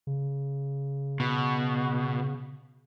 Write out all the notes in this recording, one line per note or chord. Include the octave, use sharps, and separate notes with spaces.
C#3
B2